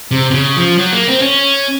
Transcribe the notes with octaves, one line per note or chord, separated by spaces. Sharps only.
C3
C3
C#3
F3
F#3
A#3
C4
C#4